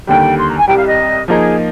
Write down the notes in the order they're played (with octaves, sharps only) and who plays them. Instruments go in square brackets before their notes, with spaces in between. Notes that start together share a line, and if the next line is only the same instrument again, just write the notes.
[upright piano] D#2 D3 G3 [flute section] G5
[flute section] C6
A#5
G#5
[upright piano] C2 C3 G3 [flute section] G5
[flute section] F5
D#5
[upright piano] F3 A#3 D#4 [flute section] G#4